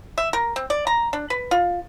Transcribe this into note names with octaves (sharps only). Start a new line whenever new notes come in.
E5
A#4
C4
D5
A#5
D4
B4
F4